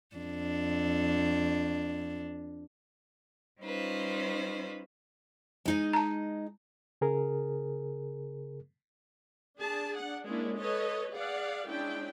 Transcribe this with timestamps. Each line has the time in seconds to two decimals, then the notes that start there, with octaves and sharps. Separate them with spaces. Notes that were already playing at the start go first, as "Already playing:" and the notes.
0.16 F2 D4
3.61 G3 C#4 D#4 F4 B4 C5
5.66 G#3 D#4 D#5
5.93 A5 A#5
7.01 C#3 G#4 A#4
9.58 D4 G#4 A5
9.97 D4 F#5
10.26 G#3 A#3 C#4 D4 E4
10.57 A4 B4 C#5 D#5
11.13 G#4 D5 F5 F#5
11.67 G#3 C#4 D4 E4 G5